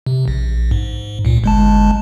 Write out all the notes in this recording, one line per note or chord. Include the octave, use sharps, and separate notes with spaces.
C3
A#1
G#2
C#2 A#2
G1 G#3 A5